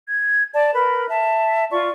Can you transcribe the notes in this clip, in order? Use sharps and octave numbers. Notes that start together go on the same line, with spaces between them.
G#6
D5 A5
A#4 B4 B5
E5 A5
F4 D5 C#6